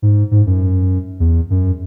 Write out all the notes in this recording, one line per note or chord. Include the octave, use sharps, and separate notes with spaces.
G#2
G#2
F#2
E2
F#2